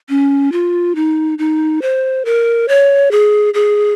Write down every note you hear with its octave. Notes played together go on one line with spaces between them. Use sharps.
C#4
F4
D#4
D#4
C5
A#4
C#5
G#4
G#4